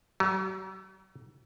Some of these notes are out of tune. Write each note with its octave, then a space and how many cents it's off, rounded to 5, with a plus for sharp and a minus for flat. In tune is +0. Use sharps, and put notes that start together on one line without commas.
F#3 +45